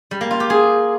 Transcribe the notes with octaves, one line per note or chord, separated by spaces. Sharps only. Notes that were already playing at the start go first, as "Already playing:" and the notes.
G3
A#3
F4
G4
G#4